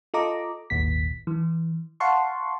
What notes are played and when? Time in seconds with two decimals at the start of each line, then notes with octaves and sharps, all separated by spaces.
0.14 F4 A4 D#5 A#5 D6
0.70 G#1 D#2 A#2 B6
1.27 E3
2.00 F5 F#5 A5 C6 C#6